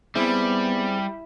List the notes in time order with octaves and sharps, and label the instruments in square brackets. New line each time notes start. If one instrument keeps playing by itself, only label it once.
[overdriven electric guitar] G3 [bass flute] B3 [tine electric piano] C4 G#4 C5 [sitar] E4